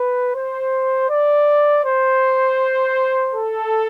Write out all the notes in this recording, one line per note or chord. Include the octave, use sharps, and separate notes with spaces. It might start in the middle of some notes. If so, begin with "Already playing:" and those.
Already playing: B4
C5
D5
C5
A4